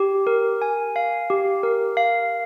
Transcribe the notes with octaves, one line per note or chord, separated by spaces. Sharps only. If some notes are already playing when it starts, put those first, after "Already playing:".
Already playing: G4
A#4
G#5
F5
G4
A#4
F5